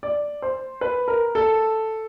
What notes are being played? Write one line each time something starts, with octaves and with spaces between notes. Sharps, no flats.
D5
C5
B4
A#4
A4